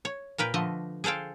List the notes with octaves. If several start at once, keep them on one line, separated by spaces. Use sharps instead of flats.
C#5
A#2 A#4 B4 G5
D3 F3 A3 D#5
G#4 A4 C5 F5 G5